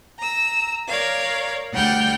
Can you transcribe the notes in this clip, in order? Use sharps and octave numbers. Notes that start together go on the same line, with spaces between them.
A#5 E6
A#4 C#5 D5 F5
D2 G3 F#5 G5 F6 G6